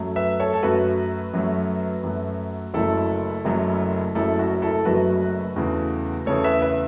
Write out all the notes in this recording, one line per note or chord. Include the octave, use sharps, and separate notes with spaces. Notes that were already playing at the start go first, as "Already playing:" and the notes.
Already playing: F#2 F#3 A3
B4 E5
A4 C#5
A4
F#2 F#3 A3 F#4 B4
F#2 F#3 A3
F#2 F#3 A3
F#1 F#2 F#3 A3 E4 A4
F#1 F#2 F#3 A3
F#1 F#2 F#3 A3 E4 A4
F#4
E4 A4
F#1 F#2 F#3 A3 F#4 B4
E2 C#3 A3
E2 C#3 A3 A4 C#5
B4 E5
B4 E5